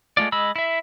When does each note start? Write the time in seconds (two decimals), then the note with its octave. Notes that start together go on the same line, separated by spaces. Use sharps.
0.17 G#3 A3 F4 D5
0.32 G#3 D#5 B5 E6
0.56 E4 E5